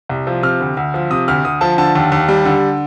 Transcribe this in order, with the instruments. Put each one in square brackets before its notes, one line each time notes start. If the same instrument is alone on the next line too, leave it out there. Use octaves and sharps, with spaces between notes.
[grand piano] C2
F3
C3 F6
D2
D2
F3
C3 D#6
D2 F6
D2 D#6
F3 A5
D3 A5
D#2
D#2
G3
D3